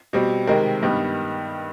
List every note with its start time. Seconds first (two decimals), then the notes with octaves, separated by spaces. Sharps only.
0.13 B2 G3 C4
0.47 C3 D#3 G#3 C4 A#4
0.83 G2 D#3 G3 B3